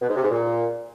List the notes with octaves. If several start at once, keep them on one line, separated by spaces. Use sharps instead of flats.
B2
G#2
C3
G#2
A#2